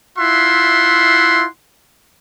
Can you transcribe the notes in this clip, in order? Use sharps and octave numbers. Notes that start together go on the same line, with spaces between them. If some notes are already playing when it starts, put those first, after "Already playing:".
E4 F4 E5 F#5 C6